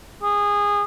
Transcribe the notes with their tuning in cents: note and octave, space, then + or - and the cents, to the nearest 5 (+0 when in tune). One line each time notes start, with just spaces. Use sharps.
G#4 -20